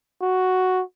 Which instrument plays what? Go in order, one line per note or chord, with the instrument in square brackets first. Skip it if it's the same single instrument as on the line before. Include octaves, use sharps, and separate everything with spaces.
[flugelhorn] F#4